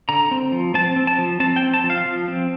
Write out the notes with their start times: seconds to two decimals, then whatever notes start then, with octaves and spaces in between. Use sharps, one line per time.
0.09 D3 A#5
0.31 C4
0.52 F3
0.74 C4 A5
0.96 C4
1.07 A5
1.18 F3
1.40 C4 A5
1.56 G5
1.63 C4
1.74 A5
1.84 F3
1.90 F5
2.06 F3
2.28 C4